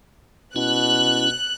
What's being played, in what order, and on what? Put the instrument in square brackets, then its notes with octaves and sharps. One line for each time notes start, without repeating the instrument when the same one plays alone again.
[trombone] B2 [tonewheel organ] C#4 E4 [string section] F#6